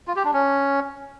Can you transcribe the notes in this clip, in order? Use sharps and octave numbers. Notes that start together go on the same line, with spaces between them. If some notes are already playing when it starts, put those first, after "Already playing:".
F4
G4
D4
C#4